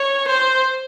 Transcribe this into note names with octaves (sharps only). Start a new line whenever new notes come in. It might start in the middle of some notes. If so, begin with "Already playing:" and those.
Already playing: C#5
C5